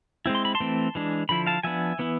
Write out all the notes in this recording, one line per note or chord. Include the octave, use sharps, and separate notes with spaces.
G#3 C4 E4
C6
B5
A5 C6
E3 A3 C4
E3 G#3 D4
D3 F3 E4 B5
F5 A5
F3 B3 D4 E5 G#5
E3 B3 E4